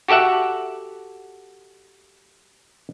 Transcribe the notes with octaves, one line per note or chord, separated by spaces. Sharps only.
F#4 G4 A4 E5 F#5